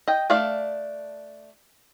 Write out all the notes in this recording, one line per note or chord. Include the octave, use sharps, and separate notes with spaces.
D#5 G5
A3 D4 D5 F5